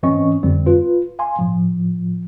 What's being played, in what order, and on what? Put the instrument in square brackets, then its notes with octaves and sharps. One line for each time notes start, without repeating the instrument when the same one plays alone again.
[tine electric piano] G#2 E3 C4 C#4 D#5 C#6
F2 D3 G3 C4
F4 B4
F5 G#5 C6
A2 F3